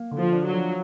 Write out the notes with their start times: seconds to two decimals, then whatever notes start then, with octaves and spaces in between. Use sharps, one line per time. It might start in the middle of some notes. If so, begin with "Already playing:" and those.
Already playing: A#3
0.11 D3
0.18 F3
0.33 D4
0.47 F#3
0.53 F3